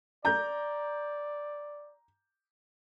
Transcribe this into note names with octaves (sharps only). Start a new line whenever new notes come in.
D5 A#5 G6